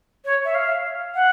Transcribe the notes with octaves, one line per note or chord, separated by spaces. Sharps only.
C#5
E5
F5
F#5